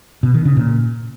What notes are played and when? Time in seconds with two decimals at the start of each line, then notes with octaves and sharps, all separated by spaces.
0.23 B2
0.34 D#3
0.45 C#3
0.57 A#2